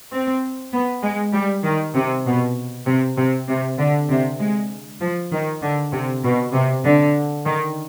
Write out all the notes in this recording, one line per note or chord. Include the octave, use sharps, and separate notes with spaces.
C4
B3
G#3
G3
D#3
C3
B2
C3
C3
C3
D3
C3
G#3
F3
D#3
D3
C3
B2
C3
D3
D#3